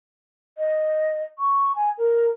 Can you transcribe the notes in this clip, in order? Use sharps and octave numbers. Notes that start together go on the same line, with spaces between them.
D#5
C#6
G#5
A#4